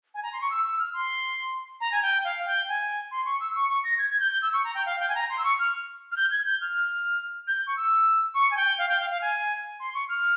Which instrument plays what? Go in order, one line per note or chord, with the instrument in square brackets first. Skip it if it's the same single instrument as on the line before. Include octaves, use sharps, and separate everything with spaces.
[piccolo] G#5
A#5
C6
C#6
E6
E6
F6
C6
A#5
G#5
G5
F5
G5
G#5
C6
C#6
E6
C#6
C#6
A#6
G#6
G#6
G6
G6
E6
C#6
A#5
G5
F5
G5
G#5
A#5
C6
E6
C#6
F6
F6
G6
G#6
G6
F6
G6
C#6
E6
C#6
G#5
G5
F5
G5
F5
F5
G#5
C6
C#6
F6